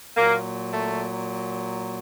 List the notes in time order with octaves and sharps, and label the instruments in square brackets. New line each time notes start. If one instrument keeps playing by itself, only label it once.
[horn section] A#2 F#3 A#3
A3